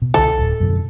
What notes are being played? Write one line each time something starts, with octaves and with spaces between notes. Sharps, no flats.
B2
C2 D3 A4
D1
F#2 B2 D3